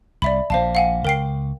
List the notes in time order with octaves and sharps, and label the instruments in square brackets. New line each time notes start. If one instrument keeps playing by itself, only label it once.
[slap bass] C2 [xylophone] D5 E5 B5
[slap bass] A#1 A#2 [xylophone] C5 F5 A5
[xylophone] F5 F#5 G#5
[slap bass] C#2 [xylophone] A#4 G5 C7